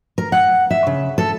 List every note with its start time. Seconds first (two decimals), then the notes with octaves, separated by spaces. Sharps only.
0.18 A#4
0.32 F#5
0.71 E5
0.87 C#3
1.18 A4